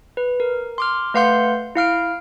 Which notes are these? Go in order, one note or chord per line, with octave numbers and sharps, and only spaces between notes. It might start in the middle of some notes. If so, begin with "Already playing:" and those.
B4
A#4
C6 D6 F6
A3 B4 F5 F#5 C6 G6
E4 F5 F6 D7